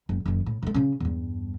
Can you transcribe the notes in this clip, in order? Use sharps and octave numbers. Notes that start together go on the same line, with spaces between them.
F#1
F#1 D#3
A2
C3 A3
C#3 C#4
E2 G2